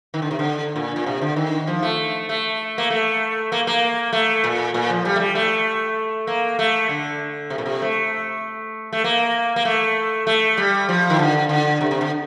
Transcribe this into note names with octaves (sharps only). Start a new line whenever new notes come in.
D#3
D3
C3
D3
A#2
A#2
C3
D3
D#3
F3
A3
A3
A#3
A3
A#3
A#3
A3
A#2
A#2
F3
G3
A3
G3
A3
A#3
A3
D3
C3
A#2
C3
A3
A3
A#3
A#3
A3
A3
G3
F3
D#3
D3
D3
C3
C3
D3